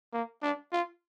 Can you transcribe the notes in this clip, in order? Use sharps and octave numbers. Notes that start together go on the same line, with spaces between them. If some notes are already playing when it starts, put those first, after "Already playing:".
A#3
D4
F4